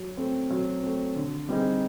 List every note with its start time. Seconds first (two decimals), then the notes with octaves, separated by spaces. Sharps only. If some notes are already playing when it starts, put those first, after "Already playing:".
Already playing: F#3
0.17 A3 C4
0.50 F#3
0.83 A3 C4
1.16 D3
1.49 G3 C4 D#4 G#4